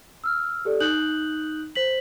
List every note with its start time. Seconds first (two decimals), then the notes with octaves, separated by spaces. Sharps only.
0.24 E6 F6
0.65 G4 A4 D5
0.80 D#4 D#6 F#6 G6 F#7
1.75 C5 B6 F#7